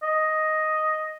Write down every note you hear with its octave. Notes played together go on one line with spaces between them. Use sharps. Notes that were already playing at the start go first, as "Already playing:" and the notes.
D#5